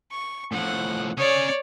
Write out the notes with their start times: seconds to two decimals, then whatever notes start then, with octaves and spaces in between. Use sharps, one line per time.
0.11 C#6
0.52 A2 F3 F#5
1.18 C#4 G#4 C#5 D5